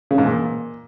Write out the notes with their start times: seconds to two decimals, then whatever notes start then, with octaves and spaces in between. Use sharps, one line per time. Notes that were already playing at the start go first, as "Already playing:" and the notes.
0.11 C#3
0.18 G#2
0.25 A#2